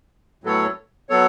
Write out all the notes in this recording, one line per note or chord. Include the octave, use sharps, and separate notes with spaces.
A2 F#3 B3 A4 C#5
F#3 B3 A4 C#5